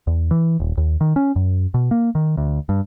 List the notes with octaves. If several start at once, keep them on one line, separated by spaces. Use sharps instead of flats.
E2
E3
D#1
D#2
D#3
C#4
F#2
B2
A#3
D#3
D2
G2